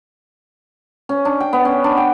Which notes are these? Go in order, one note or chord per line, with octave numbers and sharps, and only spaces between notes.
C#4
D4
G5
B3
C#4
D4
G5